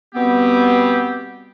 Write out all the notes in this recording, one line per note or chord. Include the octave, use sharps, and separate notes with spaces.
B2 G3 B3 C4 G4